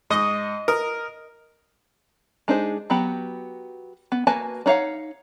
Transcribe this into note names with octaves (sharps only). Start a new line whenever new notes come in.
G#2 D#5
A#4 D#6
G#3 D4 D#4 G#4 C5
F#3 B3 F#4 G4 B5
B3
A#3 F#4 B4 G#5 A5
D4 D#4 C#5 F5 F#5